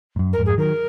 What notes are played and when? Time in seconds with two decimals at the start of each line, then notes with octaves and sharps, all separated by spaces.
0.16 G#2
0.19 F#2
0.32 A#4
0.39 F2 G#2
0.45 G#4
0.58 D#3 F#3 A#4